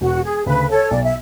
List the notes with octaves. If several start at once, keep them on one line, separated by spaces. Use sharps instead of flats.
E1 F#4
G#4
D2 C#3 B4
A4 C#5
B1 D5
E5